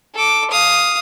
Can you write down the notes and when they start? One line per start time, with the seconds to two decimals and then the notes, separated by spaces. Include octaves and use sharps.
0.14 A4 D6
0.51 F5 D#6